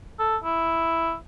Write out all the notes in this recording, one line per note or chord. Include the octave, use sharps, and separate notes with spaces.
A4
E4